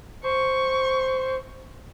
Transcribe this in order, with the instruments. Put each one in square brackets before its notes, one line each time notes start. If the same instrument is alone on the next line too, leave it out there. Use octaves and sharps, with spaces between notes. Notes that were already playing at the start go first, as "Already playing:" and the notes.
[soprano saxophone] C5 [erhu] C#6